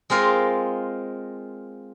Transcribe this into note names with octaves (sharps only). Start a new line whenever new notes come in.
G#3 C4 F4 A#4 F5